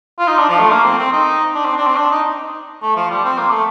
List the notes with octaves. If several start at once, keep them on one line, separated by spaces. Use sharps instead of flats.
F4
D#4
D4
F3
A3
A#3
C4
C4
D#4
D4
C4
D4
C4
D4
D#4
A3
F3
G3
C4
A#3
A3